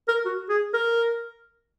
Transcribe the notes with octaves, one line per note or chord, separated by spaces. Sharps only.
A#4
F#4
G#4
A#4